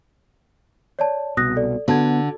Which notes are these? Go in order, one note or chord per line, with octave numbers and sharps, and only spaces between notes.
C#5 D5 A5
C2 B2 D#6 F#6 A#6
A4 D5
D3 B3 F#4 A5 G#6